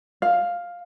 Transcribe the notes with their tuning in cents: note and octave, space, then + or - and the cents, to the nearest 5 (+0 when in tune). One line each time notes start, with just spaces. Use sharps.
F5 +5